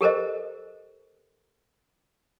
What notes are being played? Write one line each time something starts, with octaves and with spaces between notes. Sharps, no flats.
G4 A4 A#4 C5 D#5